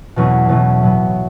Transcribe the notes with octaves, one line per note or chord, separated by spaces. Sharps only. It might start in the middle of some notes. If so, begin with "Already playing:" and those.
E2 B2 F#3 A3 C#4
E2 B2 F#3 A3 C#4
A2 F#3 B3